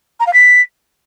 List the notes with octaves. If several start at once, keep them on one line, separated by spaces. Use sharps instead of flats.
A#5
F5
B6